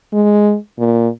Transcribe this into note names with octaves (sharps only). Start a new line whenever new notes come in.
G#3
A#2